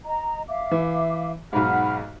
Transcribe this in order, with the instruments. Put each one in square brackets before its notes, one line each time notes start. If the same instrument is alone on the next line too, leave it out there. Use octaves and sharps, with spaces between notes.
[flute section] D#5 A#5
E5 F5 D6
[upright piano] E3
[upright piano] B1 G#2 [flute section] F#5 B5 F6